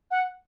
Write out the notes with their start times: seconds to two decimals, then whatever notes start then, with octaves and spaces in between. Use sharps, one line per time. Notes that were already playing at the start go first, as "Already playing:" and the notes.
0.11 F#5